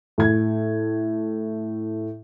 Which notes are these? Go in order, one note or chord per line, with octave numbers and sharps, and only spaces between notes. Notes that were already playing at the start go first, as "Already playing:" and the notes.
A2 G#6